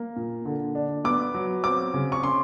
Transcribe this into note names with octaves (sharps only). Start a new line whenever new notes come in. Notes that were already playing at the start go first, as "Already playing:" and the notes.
Already playing: A#3
A#2
D3
D4
B3 D6
F#3
C4 D6
C#3
C#6
C#4 C6